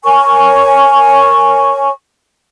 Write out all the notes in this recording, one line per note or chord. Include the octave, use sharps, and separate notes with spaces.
A#4 C#5 G#5 C#6